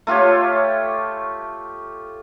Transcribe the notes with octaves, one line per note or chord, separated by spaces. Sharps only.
A3 F4 G4 C#5